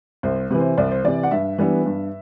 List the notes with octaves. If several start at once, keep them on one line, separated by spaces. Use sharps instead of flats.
C2 C5
C3 E3 B4 C5
C2 D5
C5
C3 E3 D5
F#5
G2 E5
E3 G3 B3 D4
G2